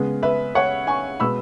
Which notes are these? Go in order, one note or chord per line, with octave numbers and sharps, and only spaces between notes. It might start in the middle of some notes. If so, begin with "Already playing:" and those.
Already playing: C#3 G#3 B3
B4 E5
C#5 F#5
G#5 C#6
B2 G#3 B3 B5 E6